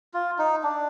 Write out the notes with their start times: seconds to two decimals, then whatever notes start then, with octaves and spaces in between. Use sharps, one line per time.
0.14 F4
0.39 D#4
0.63 D4